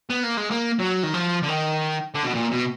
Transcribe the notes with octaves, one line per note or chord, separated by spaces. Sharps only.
B3
A#3
G#3
A#3
F#3
D#3
F3
D3
D#3
D3
B2
A#2
B2